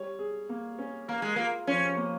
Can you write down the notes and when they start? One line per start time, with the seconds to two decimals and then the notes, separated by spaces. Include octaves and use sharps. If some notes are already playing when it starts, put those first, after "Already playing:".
Already playing: G3 C#5
0.19 G#4
0.49 A#3
0.79 C#4
1.08 A#3 A#4
1.22 G#3
1.36 A#3 F4
1.67 F3 C#4
1.97 A#3